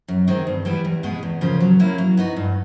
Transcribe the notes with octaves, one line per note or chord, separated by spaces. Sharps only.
F#2
D#3 G#3 C4
G2
E3 G3 B3 E4
E2
B2 G#3 B3
E2
C#3 F3 A#3 C#4
F#3
A#3 C#4 E4
F#3
B3 D#4 F#4
G2